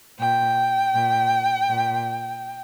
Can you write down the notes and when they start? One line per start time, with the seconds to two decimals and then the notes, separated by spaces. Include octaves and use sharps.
0.19 A#2 G5
0.94 A#2
1.69 A#2